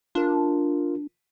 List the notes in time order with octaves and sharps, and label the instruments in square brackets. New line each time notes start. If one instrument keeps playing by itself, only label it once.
[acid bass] D4 [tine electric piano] F4 A#4